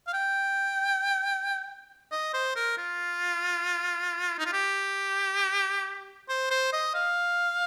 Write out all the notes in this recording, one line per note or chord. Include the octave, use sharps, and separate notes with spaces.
F5
G5
D#5
C5
A#4
F4
D#4
F4
G4
C5
C5
D#5
F5